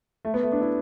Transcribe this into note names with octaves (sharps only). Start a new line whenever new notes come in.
A3
B3
A3
D4
E4